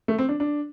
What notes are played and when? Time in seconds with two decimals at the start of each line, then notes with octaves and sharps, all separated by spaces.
0.08 A3
0.18 C4
0.29 D4
0.40 D4